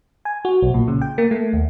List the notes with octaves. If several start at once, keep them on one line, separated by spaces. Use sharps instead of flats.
G#5
F#4
B1
A#2
C#3
G5
A#3
A3
D#2